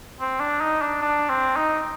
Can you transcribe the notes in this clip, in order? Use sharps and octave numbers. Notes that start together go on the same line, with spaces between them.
C4
D4
D#4
D4
D4
C4
D#4